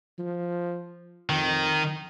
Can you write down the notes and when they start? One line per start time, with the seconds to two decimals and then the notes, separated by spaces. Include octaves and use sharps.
0.19 F3
1.30 F2 D#3